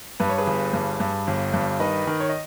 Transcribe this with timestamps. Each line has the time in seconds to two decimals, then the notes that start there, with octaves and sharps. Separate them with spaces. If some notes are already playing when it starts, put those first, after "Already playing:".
0.20 G2 B4
0.29 C#5
0.38 G#4 B4
0.47 G1
0.73 G2
1.00 G2
1.27 G1
1.54 G2
1.80 D#3 B4 D#5
2.07 D#3
2.20 C#5
2.29 D#5